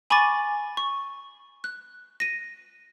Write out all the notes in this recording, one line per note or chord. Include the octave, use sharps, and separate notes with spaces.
G#5 B5 C#6 D6 A6 D#7
C#6
F#6
A#6 D#7